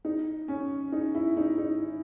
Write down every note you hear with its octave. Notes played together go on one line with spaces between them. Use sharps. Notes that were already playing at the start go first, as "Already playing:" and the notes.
D#4
C#4
D#4
E4
D#4
D#4